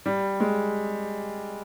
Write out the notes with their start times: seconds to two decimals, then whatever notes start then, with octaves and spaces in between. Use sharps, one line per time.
0.06 G3
0.40 G#3